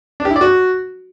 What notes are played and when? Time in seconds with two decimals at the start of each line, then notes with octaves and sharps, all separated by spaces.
0.20 D4
0.25 G4
0.30 E4
0.36 D5
0.41 F#4